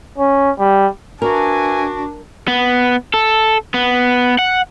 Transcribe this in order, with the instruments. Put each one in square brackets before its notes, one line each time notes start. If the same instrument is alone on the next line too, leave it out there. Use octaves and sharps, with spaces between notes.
[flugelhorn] C#4
G3
[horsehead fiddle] D4 [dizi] F#4 [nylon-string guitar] A#4 [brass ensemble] B4 E5 G#5
[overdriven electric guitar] B3
A4
B3
F#5